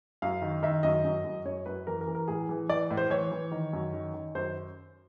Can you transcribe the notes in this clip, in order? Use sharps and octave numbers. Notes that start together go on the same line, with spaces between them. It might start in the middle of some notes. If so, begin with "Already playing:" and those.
F#2 F5
D#3
D#3 E5
F#2 D#5
F#2
F#2
F#2 C#5
F#2 B4
E3 A#4
A#4
E3
A#4
A2 G#4
E3
E3 D5
A2
C5
E3 C#5
E3
D#3
F#2
D#3
D#3
F#2 C5